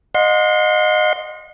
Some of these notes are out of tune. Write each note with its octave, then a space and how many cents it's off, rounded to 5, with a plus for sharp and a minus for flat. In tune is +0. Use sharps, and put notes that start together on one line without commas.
D#5 -15 F#5 -45 C6 +0